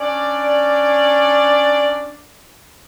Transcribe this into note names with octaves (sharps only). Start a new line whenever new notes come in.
C#4 D4 D5